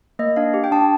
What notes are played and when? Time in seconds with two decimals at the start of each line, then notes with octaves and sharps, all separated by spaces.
0.19 A#3 D#5
0.36 D4 F5
0.54 G4
0.64 G5
0.72 D4 A5